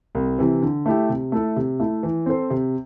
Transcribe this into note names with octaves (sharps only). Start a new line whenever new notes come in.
C2
C3 E3
D3
A3 E4 G4
C3
A3 E4 A4
C3
A3 E4
E3
C4 A4 C5
C3